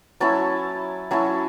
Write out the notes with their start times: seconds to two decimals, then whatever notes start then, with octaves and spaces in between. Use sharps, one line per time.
0.20 F#3 C#4 E4 A5
1.11 F#3 C#4 E4 A5